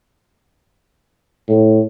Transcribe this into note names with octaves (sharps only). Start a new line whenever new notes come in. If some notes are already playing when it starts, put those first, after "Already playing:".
A2